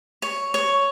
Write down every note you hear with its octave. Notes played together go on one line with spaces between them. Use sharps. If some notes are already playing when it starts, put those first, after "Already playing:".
C#5
C#5